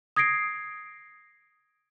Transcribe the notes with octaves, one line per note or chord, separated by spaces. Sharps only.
D#6 G#6 A#6 C7 D7